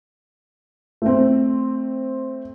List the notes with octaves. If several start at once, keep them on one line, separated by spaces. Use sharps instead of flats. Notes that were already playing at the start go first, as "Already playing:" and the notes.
A3 C4